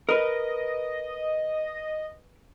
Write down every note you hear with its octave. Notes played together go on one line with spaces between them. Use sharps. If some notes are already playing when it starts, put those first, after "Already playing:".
A#4 B4 D#5